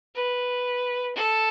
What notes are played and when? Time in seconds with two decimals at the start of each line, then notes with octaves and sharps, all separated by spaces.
0.15 B4
1.15 A4